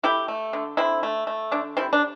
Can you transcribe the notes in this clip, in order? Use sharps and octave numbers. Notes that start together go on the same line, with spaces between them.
A3 E4 G4
A3
D3
D3 C4 E4
A3
A3
D3 D4
G3 C4 E4
D4